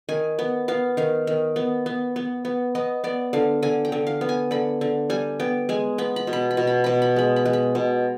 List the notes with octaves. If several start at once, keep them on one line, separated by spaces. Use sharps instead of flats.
D#3 G#5
B3
B3 F5
D#3 F5
D#3
B3
B3
B3
B3
B3 D#5
B3 D5
D3 F5
D3 G#5
G5
D3
F5
B3
G#5
D3 B5
D3
G3 G#5
B3 G5
G#3 G#5
B3 B5
B5
B2
B5
B5
B2
B5
B2 B5
B5
G#3 B5
B5
G#3
B5
B2